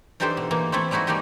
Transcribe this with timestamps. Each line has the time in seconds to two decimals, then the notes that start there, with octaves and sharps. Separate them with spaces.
0.20 E3 D4 D#4 G4 A4 C5
0.37 B2
0.51 E3 A#3 D#4
0.72 A3 C4 E4 A4
0.91 G3 G#3 D#4 E4 F#4
1.07 G3 G#3 A#3 D#4 G4 D#5